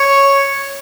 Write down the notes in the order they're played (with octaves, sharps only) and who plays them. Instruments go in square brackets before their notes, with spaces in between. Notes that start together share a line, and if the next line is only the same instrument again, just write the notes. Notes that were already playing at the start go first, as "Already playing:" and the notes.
Already playing: [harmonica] C#5